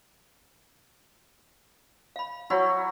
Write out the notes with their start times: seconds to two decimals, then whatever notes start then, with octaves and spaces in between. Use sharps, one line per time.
2.16 F5 B5
2.50 F#3 E4 F#4 C#5 F#5 B5